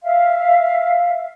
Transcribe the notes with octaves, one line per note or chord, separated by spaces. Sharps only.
E5 F5